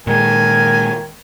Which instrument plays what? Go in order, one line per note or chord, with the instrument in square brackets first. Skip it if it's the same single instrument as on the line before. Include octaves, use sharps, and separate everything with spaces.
[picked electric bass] A#2 G#3 [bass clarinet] D#3 [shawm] G#5